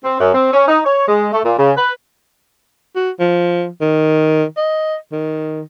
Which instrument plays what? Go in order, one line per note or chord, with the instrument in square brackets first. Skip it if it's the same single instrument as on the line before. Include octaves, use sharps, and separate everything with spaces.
[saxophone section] C4
F#2
C4
C#4
D#4
C#5
G#3
A3
A#2
C#3
B4
[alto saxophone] F#4
F3
D#3
D#5
D#3